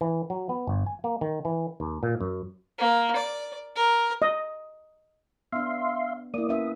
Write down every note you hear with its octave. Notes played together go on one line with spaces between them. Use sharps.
E3
F#3
B3
G1
G#5
A#3
D#3
E3
D#2
A#2
F#2
A#3
D5
A#4
D#5
B3 D4 E5 F5 C6
A#3 E4 D5 D#6
C#4 B4 E5 D#6